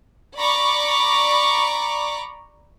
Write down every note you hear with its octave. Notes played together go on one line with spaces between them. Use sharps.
D5 A#5 B5 C#6 D6